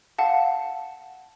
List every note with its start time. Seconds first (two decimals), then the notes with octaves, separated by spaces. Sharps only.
0.18 F5 F#5 A5